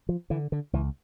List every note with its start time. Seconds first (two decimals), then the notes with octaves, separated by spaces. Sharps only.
0.09 F3
0.30 D3 E3
0.52 D3
0.73 C#2 E3